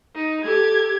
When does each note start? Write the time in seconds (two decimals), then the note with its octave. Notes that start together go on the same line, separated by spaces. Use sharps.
0.15 D#4
0.44 G4 A4 G#6